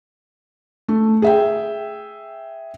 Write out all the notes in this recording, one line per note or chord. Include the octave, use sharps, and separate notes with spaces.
A3
G#4 E5 G5